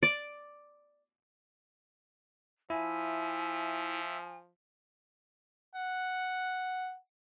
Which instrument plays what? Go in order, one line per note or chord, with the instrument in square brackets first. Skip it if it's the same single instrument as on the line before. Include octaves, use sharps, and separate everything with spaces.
[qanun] D5
[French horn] F3 [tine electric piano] E4 [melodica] E5 [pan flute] G#5
[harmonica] F#5